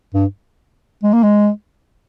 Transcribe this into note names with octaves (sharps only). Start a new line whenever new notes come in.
G2
G#3
A#3
G#3